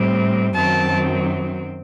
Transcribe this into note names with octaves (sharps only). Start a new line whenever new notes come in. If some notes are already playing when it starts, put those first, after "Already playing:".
Already playing: A2 G3 C4
F#2 D#3 F#3 C4 A5